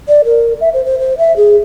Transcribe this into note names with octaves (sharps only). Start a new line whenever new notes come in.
D5
A#4
E5
C5
C5
C5
E5
G#4